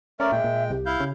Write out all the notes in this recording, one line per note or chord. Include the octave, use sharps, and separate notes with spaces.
A3 C#4 A#4 D5 E5
A#2 G#3 G5
A#2
C2 G4
E4 F5 G6
C#3